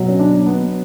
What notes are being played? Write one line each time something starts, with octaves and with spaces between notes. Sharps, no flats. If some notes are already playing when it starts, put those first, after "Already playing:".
Already playing: B2 F#3
C#4
D4
B3